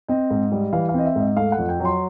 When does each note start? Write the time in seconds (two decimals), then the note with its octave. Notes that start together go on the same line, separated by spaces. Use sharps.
0.08 C4 D#5
0.30 G#2
0.52 G3
0.73 E3 F5
0.89 F5
0.94 C4 D#5
1.05 E5
1.16 G#2 D#5
1.37 A3 F5
1.52 F#5
1.58 F2
1.69 G5
1.80 F#3
1.85 C6